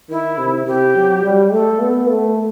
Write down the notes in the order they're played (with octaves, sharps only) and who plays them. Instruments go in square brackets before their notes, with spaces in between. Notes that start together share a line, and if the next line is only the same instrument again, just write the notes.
[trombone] D#3 [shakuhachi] E4
[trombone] C3
[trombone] C3 [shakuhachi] G4
[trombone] F#3
G3
[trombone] A3 [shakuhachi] A4
[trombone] B3
A3